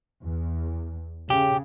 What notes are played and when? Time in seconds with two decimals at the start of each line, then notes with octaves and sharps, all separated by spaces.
0.22 E2
1.30 C#3 G4